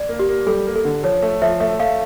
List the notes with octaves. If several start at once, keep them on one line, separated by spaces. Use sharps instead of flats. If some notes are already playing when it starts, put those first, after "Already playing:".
Already playing: D5
A#3
G4
A#3
G3 A4
A#3
A4
D3
F3 C#5
A3
F3 E5
A3 E5
A3 F5